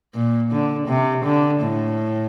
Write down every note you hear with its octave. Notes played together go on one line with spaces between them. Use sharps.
A#2
D3
C3
D3
A2